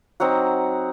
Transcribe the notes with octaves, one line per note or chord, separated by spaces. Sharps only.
F#3 C4 D#4 F#5